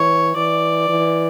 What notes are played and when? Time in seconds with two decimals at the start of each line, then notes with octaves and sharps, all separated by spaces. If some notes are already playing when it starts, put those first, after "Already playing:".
Already playing: E3 C#5
0.36 E3 D5
0.89 E3